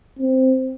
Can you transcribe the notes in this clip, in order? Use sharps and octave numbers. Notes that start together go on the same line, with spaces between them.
C4